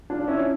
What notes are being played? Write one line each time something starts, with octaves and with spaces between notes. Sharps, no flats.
D4 F4
C#4 E4